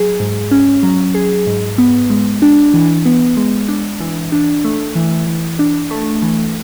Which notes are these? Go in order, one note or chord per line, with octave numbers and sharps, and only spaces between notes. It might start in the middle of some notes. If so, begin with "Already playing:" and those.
Already playing: F#3 G#4
G#2
C#4
F#3
G#4
G#2
B3
G#3
D4
E3
B3
G#3
D4
E3
D4
A3
E3
E3
D4
A3
E3